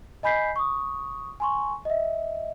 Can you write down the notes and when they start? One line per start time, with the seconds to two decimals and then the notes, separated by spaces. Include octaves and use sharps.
0.23 D#5 G#5 B5 G6 B6 C7
0.56 C#6 D#6
1.40 G#5 C6 C#6
1.85 D#5 E5